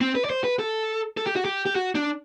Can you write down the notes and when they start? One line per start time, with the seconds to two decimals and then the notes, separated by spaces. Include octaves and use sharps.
0.01 C4
0.15 B4
0.25 D5
0.30 C5
0.44 B4
0.59 A4
1.17 A4
1.26 G4
1.36 F#4
1.45 G4
1.66 G4
1.75 F#4
1.95 D4